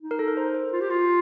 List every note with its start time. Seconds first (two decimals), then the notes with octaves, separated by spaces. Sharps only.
0.01 D#4
0.11 A#4
0.19 A4
0.28 A#4
0.37 C5
0.54 C5
0.73 F4
0.81 G4
0.90 F4